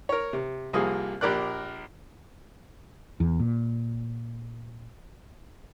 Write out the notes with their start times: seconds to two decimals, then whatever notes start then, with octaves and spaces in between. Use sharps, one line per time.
0.09 A#4 C#5
0.33 C3
0.73 C2 C3 F3 A#3 G#4 D#6
1.21 A#1 G4 A#4 D5 F#6
3.20 E2
3.40 A#2